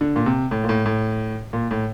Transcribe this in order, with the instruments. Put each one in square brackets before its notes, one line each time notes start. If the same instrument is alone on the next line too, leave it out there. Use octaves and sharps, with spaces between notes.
[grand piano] D3
A#2
C3
A2
A#2
A2
A2
A#2
A2